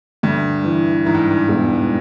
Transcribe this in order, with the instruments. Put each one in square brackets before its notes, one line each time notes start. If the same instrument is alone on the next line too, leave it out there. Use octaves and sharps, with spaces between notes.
[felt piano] D2 [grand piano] G2
[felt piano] E3
[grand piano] G#2 [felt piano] E3
[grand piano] G2
G2
[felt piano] E1